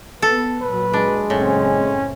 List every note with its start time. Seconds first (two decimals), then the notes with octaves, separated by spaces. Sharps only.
0.22 B3 A4
0.62 A#2 F#3 B4
0.93 G#3 D4
1.30 F#1 A2 C4 C#4